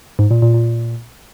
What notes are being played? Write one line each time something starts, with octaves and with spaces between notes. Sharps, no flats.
G#2
A#2
A#2
A#2